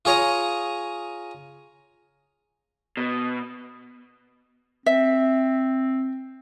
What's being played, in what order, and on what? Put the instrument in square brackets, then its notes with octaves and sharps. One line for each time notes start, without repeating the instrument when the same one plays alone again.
[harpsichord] F4 G#4 C#5 A#5 D#6
[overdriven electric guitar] B2
[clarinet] C4 [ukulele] E5